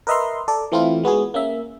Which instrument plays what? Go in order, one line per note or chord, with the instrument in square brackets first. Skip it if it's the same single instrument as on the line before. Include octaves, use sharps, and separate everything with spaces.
[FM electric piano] A#4 B4 D#5 E5 A#5 C6
A4 D5
E3 A3 C4 E4 F4
G#3 B3 F#4 G#4
A#3 C#4 E5